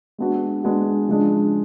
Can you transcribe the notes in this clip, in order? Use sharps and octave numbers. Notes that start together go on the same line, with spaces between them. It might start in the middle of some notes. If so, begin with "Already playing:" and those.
G#3 B3 D4 F#4
G#3 B3 D4 F#4
C#3 F3 G#3 D4